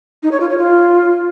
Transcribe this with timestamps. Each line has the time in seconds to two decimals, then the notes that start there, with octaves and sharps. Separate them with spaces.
0.23 D#4
0.32 C#5
0.40 F4
0.49 C#5
0.58 F4